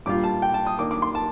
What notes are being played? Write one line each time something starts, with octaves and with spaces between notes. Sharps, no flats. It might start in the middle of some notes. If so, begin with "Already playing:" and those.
A#2 G3 D4 F4 D6
A5
G5
A5
D#6
D#3 A#3 D4 D6
D6
C6
A5